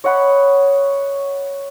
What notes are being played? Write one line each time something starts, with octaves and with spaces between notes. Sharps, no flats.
C#5 D#5 F#5 B5